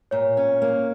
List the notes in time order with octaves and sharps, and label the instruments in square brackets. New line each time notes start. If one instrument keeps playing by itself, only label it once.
[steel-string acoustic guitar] A#2 [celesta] C#5
[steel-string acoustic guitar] C#4
A#3